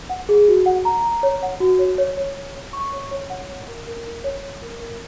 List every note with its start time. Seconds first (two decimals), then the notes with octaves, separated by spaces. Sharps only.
0.10 F#5
0.29 G#4
0.48 F#4
0.66 F#5
0.85 A#5
1.04 A#5
1.23 C#5
1.42 F#5
1.60 F#4
1.79 C#5
1.98 C#5
2.17 C#5
2.36 C#5
2.55 C#5
2.73 C#6
2.93 C#5
3.11 C#5
3.30 F#5
3.48 C#5
3.68 A#4
3.87 A#4
4.06 A#4
4.24 C#5
4.43 C#5
4.62 A#4
4.80 A#4